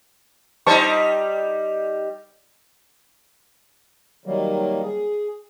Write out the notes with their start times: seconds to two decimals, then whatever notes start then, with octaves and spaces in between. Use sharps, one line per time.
0.67 G3 D#4 C5 A5 C#6
4.26 D#3 F#3 G3 A#3
4.83 G#4